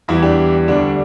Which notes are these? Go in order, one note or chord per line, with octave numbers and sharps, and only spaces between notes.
E2 E3 G3 E4
D4 G4
D2 D3 G3 D4